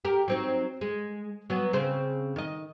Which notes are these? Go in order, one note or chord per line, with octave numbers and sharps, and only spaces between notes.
G4 A#4
F#3 C4 D#4
G#3
F#3 B3
C#3 C4 C5
D#3 D#5